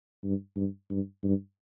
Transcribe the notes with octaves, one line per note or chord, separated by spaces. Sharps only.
G2
G2
G2
G2